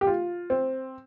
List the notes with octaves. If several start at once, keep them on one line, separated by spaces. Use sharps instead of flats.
G4
F4
C4